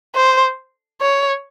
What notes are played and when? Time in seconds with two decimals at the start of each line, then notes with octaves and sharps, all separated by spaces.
0.15 C5
1.01 C#5